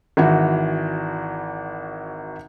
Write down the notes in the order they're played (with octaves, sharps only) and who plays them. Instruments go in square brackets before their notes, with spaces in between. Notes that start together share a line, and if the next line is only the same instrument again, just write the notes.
[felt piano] G#1 E3 F#4